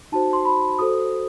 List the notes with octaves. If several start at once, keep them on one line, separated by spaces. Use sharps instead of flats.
D#4 F#4 C5 A5
C6
B5
F#4 A4 C5 D#6